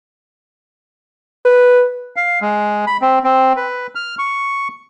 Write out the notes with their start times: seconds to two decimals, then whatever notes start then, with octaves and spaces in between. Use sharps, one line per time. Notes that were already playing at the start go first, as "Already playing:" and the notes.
1.45 B4
2.16 F5
2.41 G#3
2.87 B5
3.02 C4
3.24 C4
3.56 B4
3.95 F6
4.19 C#6